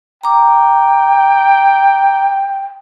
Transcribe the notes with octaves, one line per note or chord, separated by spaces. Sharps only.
G5 A#5 D6